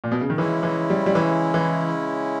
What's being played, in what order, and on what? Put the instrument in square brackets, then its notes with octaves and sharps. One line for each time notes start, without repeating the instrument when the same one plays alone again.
[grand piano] A#2
B2
C#3
D#3
[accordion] C#3 G#3 C#4 E4 [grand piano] E3
[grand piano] E3
G3
G3
E3
E3